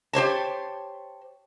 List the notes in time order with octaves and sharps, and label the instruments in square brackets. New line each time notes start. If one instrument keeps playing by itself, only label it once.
[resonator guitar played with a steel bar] G4 C5 C#5 A5